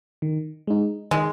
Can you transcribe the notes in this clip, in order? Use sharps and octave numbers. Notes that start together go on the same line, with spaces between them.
D#3
G#3 D#4
D#3 G#3